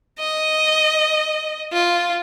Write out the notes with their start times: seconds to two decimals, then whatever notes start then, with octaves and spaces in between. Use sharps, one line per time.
0.19 D#5
1.73 F4